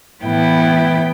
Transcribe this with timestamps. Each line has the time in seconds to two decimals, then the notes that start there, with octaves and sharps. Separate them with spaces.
0.24 A2 E3 B3 E4 G5